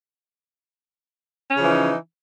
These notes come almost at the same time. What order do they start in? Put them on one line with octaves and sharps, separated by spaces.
C#4 C#3 F3 E3 D#4